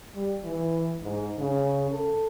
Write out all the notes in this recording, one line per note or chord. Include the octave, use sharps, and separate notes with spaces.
G3
E3
G#2
C#3
A4